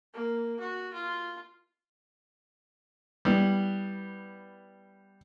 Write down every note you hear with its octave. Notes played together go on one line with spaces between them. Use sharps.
A#3
F#4
F4
G3 B3 E4